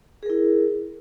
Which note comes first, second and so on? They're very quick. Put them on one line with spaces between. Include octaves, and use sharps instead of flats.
G#4 A#4 E4